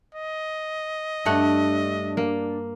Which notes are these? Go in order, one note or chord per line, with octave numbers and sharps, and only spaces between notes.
D#5
G2 A3 D4 F#5
A#3